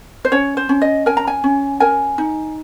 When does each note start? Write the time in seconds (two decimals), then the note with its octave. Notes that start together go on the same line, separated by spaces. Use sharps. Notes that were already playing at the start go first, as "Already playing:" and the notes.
0.25 C5
0.32 C#4 C#5
0.57 C5
0.69 C#4
0.82 D#5
1.06 A#4 G#5
1.17 A#5
1.28 G#5
1.44 C#4
1.80 A#4 G#5
2.18 D#4